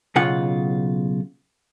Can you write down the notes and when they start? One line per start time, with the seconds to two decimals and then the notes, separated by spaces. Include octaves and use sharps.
0.16 B1 C#3 F4 F#5